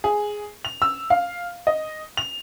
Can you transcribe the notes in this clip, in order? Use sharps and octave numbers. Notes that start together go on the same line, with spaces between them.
G#4
F7
E6
F5
D#5
F7